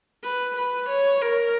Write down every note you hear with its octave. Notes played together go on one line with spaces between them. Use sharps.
B4
B4
C#5
A#4